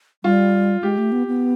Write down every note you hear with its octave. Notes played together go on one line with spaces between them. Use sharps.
G3 F4
G#3 G4
A3
B3
B3